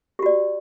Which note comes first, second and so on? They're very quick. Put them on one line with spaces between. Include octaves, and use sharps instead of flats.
G4 F#4 D5